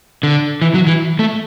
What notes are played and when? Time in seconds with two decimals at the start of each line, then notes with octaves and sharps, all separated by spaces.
0.23 D3
0.62 E3
0.74 F#3
0.87 E3
1.19 A3